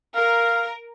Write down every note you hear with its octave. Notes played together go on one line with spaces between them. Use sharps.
A#4 F5